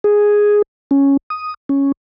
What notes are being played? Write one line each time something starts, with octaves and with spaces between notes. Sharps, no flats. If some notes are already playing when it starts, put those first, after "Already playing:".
G#4
C#4
D#6
C#4